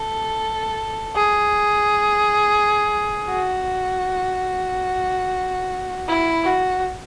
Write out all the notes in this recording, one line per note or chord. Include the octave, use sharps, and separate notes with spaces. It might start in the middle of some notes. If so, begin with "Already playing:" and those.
Already playing: A4
G#4
F#4
E4
F#4